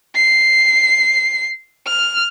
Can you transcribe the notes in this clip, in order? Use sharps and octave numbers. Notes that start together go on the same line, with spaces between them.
C7
F6